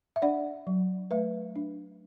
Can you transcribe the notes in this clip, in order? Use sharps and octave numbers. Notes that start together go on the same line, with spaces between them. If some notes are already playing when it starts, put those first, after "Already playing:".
E5
D4 D5 F#5
F#3
A3 B4 E5
D4